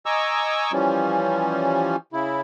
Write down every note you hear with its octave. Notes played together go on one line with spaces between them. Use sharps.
D#5 G#5 A#5 C#6 D6 E6
E3 F3 G3 C#4
C#3 E4